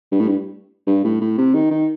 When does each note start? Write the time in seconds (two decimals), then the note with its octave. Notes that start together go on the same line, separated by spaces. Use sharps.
0.12 G2
0.20 A2
0.28 G2
0.87 G2
1.05 A2
1.21 A2
1.38 C3
1.54 D#3
1.71 D#3